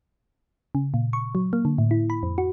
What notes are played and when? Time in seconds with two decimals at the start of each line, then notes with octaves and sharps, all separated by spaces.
0.75 C#3
0.94 A#2
1.13 C#6
1.35 F#3
1.53 A#3
1.65 D3
1.78 A2
1.91 E4
2.10 B5
2.23 F2
2.38 F#4